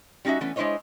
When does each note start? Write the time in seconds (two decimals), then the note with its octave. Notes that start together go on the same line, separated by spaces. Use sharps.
0.25 G3 C#4 D#4 F#4 E5
0.41 E3 A3 B3 C#4
0.56 G#3 D4 E4 C5 C#5 D#5